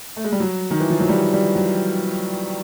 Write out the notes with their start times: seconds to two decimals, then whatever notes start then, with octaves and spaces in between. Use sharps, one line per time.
0.17 A3
0.24 G#3
0.32 G3
0.40 F#3
0.71 D#3
0.80 E3
0.90 F3
1.00 F#3
1.09 G3
1.33 G3
1.56 F#3